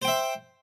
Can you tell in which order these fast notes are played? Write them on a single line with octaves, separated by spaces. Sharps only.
C5 G5 E5